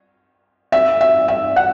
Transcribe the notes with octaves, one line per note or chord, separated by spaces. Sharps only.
E5
E5
E5
F#5